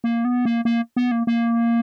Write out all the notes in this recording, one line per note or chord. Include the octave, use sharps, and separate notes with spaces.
A#3
B3
A#3
A#3
B3
A#3
A#3